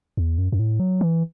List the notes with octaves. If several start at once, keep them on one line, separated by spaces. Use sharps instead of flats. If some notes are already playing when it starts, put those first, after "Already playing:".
E2
F#2
F#2
A2
F#3
E3